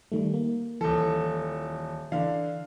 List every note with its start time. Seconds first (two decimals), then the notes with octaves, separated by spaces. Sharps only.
0.12 D#3 G3 A3
0.34 A#3
0.81 D#1 E3 A4
2.12 D3 E3 F5